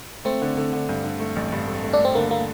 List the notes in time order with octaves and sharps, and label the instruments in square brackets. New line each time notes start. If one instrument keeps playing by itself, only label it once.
[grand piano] A3 [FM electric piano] C4
[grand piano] D3
D3
D3
G2
D3
A3
A1
G2
A3
A3
[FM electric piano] D4
[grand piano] A3
[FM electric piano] C4
[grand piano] D3 [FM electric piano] A#3
[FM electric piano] A#3